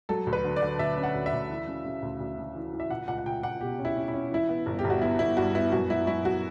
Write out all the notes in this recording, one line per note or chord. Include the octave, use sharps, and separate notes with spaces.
F#3 A4
D2
B4
D3
D5
D3
D2 E5
C#4
F#5
D2
E5
D2
E3
C#3
C#3
D2
D2
C#3
E3
E3
E5
C#2 F#5
C#2 F#5
F#5
C#2 G5
C#2 F#5
B2 G4
C#4
E4
C#4
E4
C#4
E3 E4
B3
G1
G4
G1
F#4
B3 E4
G1 E4
G2 F#4
B3 E4
F#2 F#4
F#3 E4
F#3 E4
F#3 F#4